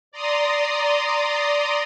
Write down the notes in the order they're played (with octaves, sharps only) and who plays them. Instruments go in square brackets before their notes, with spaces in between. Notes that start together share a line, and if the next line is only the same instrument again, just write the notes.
[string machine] D5 A#5 C6 D#6